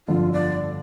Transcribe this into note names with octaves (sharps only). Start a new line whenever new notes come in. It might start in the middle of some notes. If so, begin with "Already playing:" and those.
G1 F2 D3 F3 F4
D5